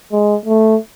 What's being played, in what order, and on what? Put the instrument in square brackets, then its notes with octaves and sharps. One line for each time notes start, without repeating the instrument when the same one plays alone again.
[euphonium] G#3
A3